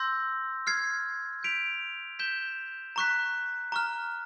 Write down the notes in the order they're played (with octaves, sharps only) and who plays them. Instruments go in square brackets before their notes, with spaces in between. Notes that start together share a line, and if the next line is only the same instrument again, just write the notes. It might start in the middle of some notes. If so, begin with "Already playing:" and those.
Already playing: [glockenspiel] C6 E6 G6 A#6
F6 G#6 C7
G6 B6 D7 F7
G6 B6 E7 G7
A#5 C#6 F#6 B6
A#5 C#6 F6